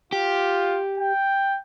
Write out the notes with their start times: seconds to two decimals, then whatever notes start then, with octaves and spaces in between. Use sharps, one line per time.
0.13 F4 G4
0.98 G5